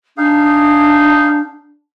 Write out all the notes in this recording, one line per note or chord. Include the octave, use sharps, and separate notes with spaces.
D4 D#4 G#4 F5